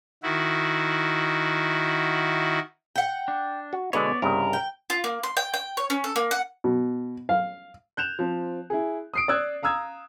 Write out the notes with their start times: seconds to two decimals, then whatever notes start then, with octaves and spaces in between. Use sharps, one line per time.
0.23 D#3 E4 F#4
2.96 F#5 G5
3.28 D4
3.73 F#4
3.93 B2 D3 G#3 B3 C#5 D5
4.22 C2 G2 C#3 A#4
4.53 G5
4.90 F4
5.04 A#3
5.23 C6
5.37 G5
5.54 G5
5.77 C#5
5.90 C#4
6.04 A4
6.16 A#3
6.31 F#5
6.64 B2
7.29 F5
7.97 F#6 G6 E7 F7
8.19 F3 C4
8.70 E4 G#4
9.14 D#6 C7 D7
9.28 D5 D#6 E6 F#6 G#6
9.62 F5 A#5 D#6 E6 G#6